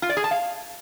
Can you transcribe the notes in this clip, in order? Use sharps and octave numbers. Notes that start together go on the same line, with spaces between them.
F4
D5
G#4
A5
F5